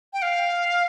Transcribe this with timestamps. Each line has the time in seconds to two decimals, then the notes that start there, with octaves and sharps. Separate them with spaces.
0.13 G5
0.22 F5